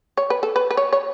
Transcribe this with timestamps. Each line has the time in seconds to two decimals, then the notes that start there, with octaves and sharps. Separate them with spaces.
0.17 C#5
0.30 B4
0.43 A4
0.56 B4
0.71 B4
0.77 C#5
0.93 C#5